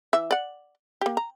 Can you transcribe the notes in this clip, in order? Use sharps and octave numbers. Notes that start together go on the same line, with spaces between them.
E3 E5
D5 F#5
A#3 G4
A#5